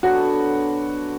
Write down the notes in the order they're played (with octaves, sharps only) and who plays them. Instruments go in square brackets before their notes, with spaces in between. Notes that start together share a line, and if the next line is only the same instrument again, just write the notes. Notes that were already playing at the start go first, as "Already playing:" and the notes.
[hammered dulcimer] D3 F#3 B3 D4 [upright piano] F#4